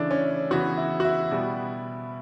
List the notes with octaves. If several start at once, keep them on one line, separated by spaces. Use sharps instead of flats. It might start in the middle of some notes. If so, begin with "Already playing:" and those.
Already playing: C#3 E3 A3 D4 E4
C#4
C#3 E3 B3 F#4
E4
F#4
E4
B2 G3 B3